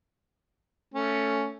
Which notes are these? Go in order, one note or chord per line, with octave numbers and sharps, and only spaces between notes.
A3 C#4